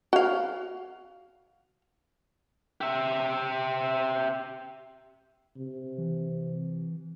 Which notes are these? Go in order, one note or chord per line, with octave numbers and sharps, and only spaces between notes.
F#4 F5
G4 E5
C3
E3